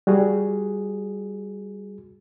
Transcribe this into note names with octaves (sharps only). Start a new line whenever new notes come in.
G3 F#4 G#4